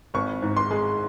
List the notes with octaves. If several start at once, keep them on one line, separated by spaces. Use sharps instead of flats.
G#1 C#6
G#2
C6
G#3